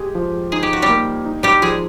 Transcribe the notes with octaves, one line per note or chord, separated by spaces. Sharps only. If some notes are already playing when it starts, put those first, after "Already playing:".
Already playing: G#3 G4 G#4
F3
D#4 G#4
G4
F#4
G3 G4
A#3
D#4
G3 G4
F3 G#3 G#4